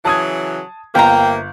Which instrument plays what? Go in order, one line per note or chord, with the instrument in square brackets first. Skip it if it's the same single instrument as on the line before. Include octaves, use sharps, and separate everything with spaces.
[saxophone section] C#3 E3 F#3 [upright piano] A5 D#6 G#6
[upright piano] G1 [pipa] C3 A#5 [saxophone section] A#3 [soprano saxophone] G5